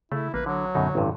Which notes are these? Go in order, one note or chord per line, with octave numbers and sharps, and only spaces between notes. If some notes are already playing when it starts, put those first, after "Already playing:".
C#3 A3 E4
A1 A#3 B4
D3 F#3
F#2 B2 D3 D#4
A1 G2 C3